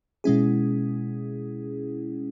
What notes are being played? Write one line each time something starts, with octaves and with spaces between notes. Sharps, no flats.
B2 G#3 C#4 E4 G#4